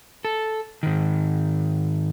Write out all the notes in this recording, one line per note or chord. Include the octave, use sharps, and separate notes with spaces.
A4
G#2 D#3